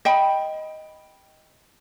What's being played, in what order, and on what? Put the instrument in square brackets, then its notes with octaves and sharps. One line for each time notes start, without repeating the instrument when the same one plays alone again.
[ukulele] D#5 G5 B5